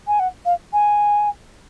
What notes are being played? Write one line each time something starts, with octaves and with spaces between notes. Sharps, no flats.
G#5
F#5
F5
G#5